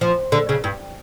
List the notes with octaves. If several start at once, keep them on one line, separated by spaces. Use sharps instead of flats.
F3
D3
C#3
G2